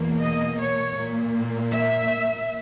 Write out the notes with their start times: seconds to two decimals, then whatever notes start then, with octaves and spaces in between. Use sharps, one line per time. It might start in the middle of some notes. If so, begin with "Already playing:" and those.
Already playing: E2 B2 A#3
0.21 D#5
0.58 C#5
0.95 A#2 A#3
1.70 E5